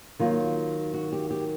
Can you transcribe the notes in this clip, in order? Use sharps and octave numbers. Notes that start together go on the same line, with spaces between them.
D#3 F#3 A#3 F4
F#4
G4
G4